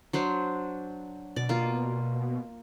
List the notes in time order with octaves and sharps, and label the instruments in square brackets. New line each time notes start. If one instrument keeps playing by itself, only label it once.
[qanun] F#3 D4 C5
[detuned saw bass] B2 [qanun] D5
[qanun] A#3 F4